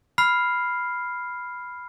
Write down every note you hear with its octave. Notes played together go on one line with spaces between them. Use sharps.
B5 F6 C7